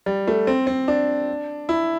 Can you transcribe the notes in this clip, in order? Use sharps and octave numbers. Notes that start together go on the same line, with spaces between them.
G3
A3
C4
C4
D4
E4